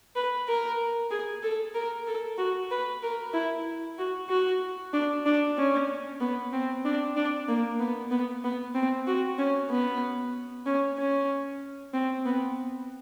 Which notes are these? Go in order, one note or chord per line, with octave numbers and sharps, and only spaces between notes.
B4
A#4
G#4
A4
A#4
A4
F#4
B4
A#4
E4
F#4
F#4
D4
D4
C#4
B3
C4
D4
D4
A#3
B3
B3
B3
C4
F#4
C#4
B3
C#4
C#4
C4
B3